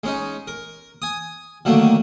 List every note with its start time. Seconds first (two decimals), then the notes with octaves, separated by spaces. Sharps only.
0.04 G#3 C#4 D#4
0.47 A#4
1.02 G#5 D#6
1.65 D3 D#3 F#3 A3 A#3